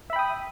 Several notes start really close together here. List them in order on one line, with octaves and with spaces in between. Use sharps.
E5 B5 G5 D#6